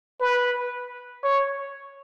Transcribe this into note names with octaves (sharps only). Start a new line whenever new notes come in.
B4
C#5